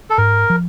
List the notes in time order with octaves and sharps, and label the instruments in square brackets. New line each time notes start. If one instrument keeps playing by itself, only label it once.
[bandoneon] A4
[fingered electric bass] G#2 [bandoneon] A#4
[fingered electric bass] F3